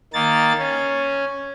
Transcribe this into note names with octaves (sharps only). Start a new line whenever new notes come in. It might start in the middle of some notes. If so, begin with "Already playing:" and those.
D#3 A#3 A6
C#4